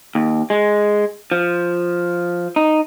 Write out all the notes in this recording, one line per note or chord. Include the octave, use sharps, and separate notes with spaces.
D#2
G#3
F3
D#4